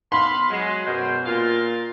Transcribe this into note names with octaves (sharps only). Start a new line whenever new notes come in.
B3 F5 B5 C6
F#3 G#3
F#2 B2 C5
A#2 F4 A#4